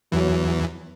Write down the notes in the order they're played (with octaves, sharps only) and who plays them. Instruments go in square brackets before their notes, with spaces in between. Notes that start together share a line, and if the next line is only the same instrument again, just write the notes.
[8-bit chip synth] E2 E3 [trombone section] F#3